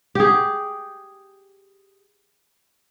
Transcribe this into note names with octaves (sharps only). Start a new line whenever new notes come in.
G4 G#4